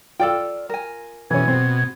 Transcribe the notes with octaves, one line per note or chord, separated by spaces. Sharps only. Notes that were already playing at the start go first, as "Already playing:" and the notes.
F4 A4 D5 G5
A#4 G#5
B2 E3 C#4 G#6
B2 C4